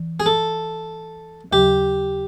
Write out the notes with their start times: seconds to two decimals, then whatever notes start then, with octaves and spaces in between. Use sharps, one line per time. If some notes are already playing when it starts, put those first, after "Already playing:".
Already playing: E3
0.20 G#4
0.26 A4
1.51 D#2 C#3 F#3 G4